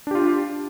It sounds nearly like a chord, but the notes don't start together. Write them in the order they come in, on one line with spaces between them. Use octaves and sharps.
D4 G4 F4